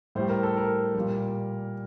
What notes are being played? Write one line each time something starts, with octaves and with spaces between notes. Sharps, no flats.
A2 G3 C5
A#4
A4
A#4
A#2 G3